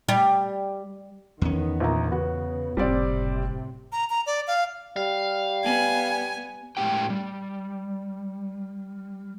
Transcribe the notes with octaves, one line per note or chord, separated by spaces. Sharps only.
G3
E2 D#3 B3 C#4
A#1 F3 A#5
C#3 B3 F#4
F#1 A2 C3 G3 C4 D5
A#5
A#5
D5
F5
G3 F5
B3 G#5
A2 G#3 C4 G4 G5
G3